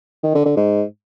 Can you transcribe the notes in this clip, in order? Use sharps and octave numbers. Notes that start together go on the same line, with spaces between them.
D#3
D3
D3
G#2